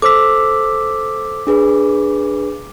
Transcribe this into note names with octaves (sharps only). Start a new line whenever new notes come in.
A4 C5 D6 E6 B6
D4 G#4 B4